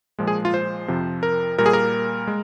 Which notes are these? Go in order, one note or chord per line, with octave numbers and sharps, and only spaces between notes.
A#2 F3 G#3
G#4
F4
C5
F2 C3 F3
A#4
A#2 G3 A#3 A#4
G#4
A#4
G#3